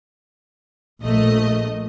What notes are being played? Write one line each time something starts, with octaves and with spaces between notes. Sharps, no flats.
A#1 A3 D#5